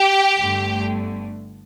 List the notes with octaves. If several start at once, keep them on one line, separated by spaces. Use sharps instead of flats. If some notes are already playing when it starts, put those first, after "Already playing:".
Already playing: G4 G5
G1 G2 D3 A3